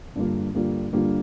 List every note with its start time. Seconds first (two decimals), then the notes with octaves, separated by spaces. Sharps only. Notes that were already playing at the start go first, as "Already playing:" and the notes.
0.15 G2 D3 G3 A#3 F4
0.54 G2 D3 G3 A#3 F4
0.93 G2 D3 G3 A#3 F4